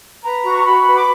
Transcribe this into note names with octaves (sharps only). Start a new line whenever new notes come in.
B4 A#5
F#4
C#6
F#4 B5
B4
D6